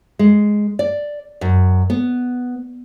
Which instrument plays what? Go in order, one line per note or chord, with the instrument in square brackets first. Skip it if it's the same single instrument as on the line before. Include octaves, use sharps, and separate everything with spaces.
[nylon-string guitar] G#3
D5
F#2
B3